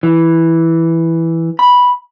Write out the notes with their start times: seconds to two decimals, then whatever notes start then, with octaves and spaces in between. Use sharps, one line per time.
0.03 E3
1.59 B5